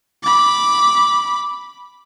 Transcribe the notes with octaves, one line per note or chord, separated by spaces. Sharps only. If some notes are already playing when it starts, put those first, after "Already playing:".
B5 D6